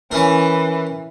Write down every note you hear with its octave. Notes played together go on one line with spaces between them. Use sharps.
E3 C#4 A#4